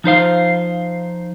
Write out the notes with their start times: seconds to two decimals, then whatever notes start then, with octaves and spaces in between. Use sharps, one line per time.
0.04 F3 D#4 C5 F5